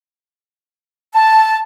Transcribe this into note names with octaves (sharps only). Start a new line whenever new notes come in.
A5